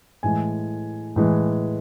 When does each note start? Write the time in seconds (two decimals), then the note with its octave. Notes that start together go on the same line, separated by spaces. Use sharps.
0.23 A2 E3 G#3 G#5
1.16 A2 E3 G#3